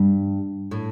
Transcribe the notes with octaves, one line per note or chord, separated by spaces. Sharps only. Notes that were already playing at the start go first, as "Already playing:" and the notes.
Already playing: G2
A2